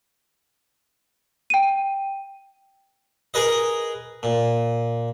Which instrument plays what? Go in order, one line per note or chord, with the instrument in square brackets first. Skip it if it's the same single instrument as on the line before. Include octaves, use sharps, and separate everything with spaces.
[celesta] G5 D#7
[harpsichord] G#4 A#4 B4 D#5
A#2